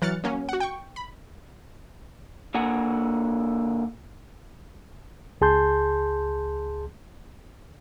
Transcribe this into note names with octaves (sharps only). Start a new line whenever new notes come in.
E3 F#3 F6 F#6 A6 C#7
F#3 A#3 C#4
F#4 F#5
G5 C#6
B5
D3 A#3 F#5 G#5
C#2 G#4 A5 C6 G6